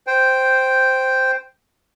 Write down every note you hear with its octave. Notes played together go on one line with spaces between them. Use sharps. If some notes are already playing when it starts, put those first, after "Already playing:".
C5 G5